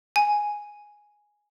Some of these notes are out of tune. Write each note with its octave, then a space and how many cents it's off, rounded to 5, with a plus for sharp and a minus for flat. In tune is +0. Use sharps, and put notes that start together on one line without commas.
G#5 +0